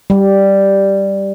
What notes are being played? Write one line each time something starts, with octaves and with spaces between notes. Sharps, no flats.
G3